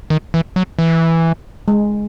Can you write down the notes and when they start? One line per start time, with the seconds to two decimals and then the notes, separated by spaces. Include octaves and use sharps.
0.10 D#3
0.34 E3
0.56 F#3
0.79 E3
1.68 G#3